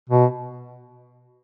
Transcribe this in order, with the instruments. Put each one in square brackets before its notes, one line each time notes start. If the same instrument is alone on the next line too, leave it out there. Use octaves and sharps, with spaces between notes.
[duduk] B2